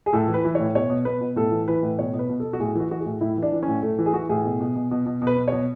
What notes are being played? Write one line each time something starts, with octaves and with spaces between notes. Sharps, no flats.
G#4
A2 A4
E3
B4
E3
A2 C#5
B2 C#5
B2
B2 B4
B2
A2 A4
E3
E3 B4
A2
B2 C#5
B2
B4
B2
B2 A4
F#4
A2 G#4
E3 F#4
E3 F#4
G#4
A2
A2 E4
E3
D4
E3
C#4
A2
A2 A3
E3 A3
G#4
E3 F#4
A2 G#4
B2
B2
B2
B2
B2
B2
B4
B2
B2 C#5